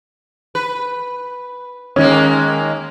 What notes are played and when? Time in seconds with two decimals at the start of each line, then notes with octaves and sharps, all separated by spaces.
0.55 B4
1.96 D#3 G#3 A#3 C#4